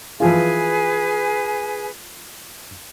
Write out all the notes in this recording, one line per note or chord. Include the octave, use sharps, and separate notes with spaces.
E3 F3 F4 G#4 B4 G#5